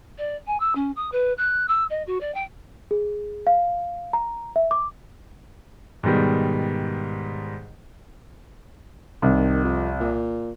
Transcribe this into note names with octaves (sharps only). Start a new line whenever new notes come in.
D5
G#5
E6
C#4
D#6
B4
F#6
E6
D#5
F#4
D5
G5
G#4
F5
A#5
E5
D6
G#2 B2 D#3 G3
C2 D#3
F2
A#2